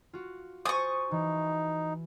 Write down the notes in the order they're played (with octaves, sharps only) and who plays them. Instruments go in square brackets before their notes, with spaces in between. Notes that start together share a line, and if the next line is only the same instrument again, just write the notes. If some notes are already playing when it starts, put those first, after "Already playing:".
[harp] F4 F#4
[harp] C5 G#5 A6 [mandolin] C#6 D#6
[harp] E3 [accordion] D#4